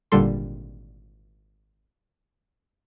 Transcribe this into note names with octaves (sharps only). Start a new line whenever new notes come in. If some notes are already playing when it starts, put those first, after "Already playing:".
G#1 A#2 D3 G3 A4 C6